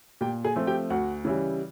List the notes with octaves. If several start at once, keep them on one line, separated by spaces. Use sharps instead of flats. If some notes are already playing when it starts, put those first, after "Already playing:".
A#2 G4 G5
G#4 G#5
F3 A3 C4
G4 G5
D2 F#4 F#5
C#3 E3 G3